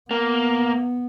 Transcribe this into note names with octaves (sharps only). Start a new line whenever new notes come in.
A#3 B3